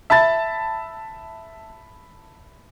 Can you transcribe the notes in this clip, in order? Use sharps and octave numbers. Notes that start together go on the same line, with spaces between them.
E5 A5 B5 A6